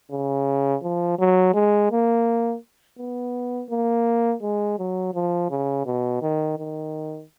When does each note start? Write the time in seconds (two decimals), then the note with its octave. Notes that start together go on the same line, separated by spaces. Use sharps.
0.11 C#3
0.82 F3
1.19 F#3
1.54 G#3
1.91 A#3
2.98 B3
3.70 A#3
4.42 G#3
4.79 F#3
5.14 F3
5.50 C#3
5.86 B2
6.22 D#3
6.58 D#3